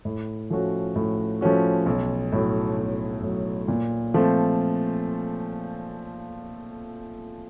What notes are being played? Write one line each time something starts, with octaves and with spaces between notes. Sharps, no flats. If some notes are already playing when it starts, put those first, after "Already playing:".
A2
F3 A3 C#4 F#4
A2
F3 A3 C#4 F#4
B1
A2 F#3
B1
A2 F#3
A#2
F3 A3 C4 F4